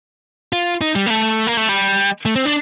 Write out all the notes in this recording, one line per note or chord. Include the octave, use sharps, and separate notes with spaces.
F4
D#4
G3
A#3
A3
A#3
A3
G3
A3
C4
D4